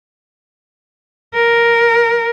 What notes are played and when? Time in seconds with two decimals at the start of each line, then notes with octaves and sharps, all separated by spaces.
1.35 A#4